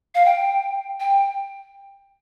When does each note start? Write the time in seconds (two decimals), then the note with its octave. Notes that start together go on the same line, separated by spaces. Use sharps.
0.15 F5
0.25 G5
1.00 G5